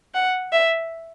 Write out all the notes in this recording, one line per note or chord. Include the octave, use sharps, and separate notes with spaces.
F#5
E5